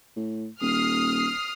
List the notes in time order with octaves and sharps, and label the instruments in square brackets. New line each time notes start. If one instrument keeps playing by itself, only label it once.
[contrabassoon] A2
[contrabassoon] D#1 [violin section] D#6 F6 C7